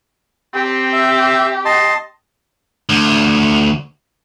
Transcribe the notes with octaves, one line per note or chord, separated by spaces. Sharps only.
C4 G4
E5
D#5 A5 C6
D2